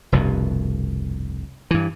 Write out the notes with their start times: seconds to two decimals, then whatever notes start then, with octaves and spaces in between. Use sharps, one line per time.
0.12 F1 C2 G2 B2
1.71 G2 E3